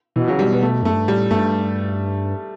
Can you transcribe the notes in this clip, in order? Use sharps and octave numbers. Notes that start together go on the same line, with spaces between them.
B2 E3
C#3 F#3
G3
B2
B3
A3
F#2 A3
G2
A2 G3
G2 A3